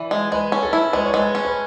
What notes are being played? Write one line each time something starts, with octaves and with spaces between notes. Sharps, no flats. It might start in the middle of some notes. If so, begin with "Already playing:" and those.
Already playing: E3 D5
G#3
G#3 B4
C#4
A4
E4
G#3 B4
C#5
G#3 B4
C#4
B4